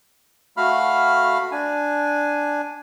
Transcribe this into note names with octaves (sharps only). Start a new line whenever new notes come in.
A3 F#4 F5 B5 F6
D4 G#5